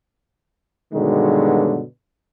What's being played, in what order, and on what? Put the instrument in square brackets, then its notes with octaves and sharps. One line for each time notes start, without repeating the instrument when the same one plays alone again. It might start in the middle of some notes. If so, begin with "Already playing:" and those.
[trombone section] G2 B2 D3 D#3 F#3 G#3